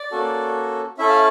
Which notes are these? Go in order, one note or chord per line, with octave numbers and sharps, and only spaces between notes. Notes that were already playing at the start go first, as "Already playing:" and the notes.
Already playing: D5
A#3 C#4 F#4 A4
C#4 E4 A4 E5
F5